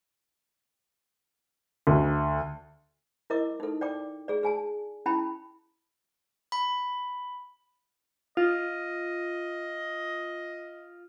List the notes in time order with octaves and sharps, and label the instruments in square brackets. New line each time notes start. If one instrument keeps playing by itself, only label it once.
[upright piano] D2
[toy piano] E4 A#4 D#5 D6 E6
D#4 A4
D5 G5 D6
G#4 D5
G#4 G#5 A5
C#4 E4 G5 A5 B5
[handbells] B5
[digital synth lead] F4 [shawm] D#5